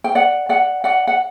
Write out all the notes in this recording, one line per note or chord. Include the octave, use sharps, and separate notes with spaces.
G5
D5 F#5
D5 F#5
D5 F#5
F#5